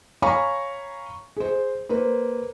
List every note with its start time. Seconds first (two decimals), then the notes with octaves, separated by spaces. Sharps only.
0.22 C#5 F5 G#5 A#5 B5 C#6
1.37 G#4 C5
1.89 A#3 B4 C5